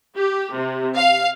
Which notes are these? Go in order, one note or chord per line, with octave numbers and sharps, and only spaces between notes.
G4
C3
F5